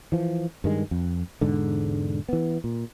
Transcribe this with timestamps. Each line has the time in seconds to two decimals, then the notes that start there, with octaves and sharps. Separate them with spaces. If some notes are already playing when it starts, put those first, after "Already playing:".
0.12 E3 F3
0.64 G2 D#3 G#3
0.91 F2
1.41 E1 G#2 D3
2.29 E3 B3
2.64 A#2